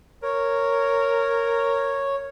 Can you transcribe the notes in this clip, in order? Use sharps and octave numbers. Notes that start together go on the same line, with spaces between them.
A#4 C#5